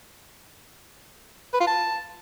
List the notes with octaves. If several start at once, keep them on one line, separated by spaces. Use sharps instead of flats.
B4
F4
A5